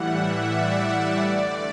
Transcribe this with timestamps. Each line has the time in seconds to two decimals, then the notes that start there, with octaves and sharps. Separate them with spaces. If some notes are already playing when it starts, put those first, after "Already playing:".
Already playing: A2 E3 G3 E5 F#5
0.31 D5
0.75 D5
1.19 D3 A3 D5